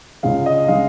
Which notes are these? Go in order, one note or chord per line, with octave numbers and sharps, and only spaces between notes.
C#2 C#3 G#3 F5
D#5
C#3 G#3 F5